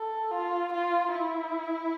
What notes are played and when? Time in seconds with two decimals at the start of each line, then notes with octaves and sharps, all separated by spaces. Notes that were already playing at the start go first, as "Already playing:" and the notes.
Already playing: A4
0.31 F4
0.73 F4
1.13 E4